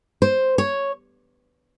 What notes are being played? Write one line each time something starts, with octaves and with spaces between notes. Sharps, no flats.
C5
C#5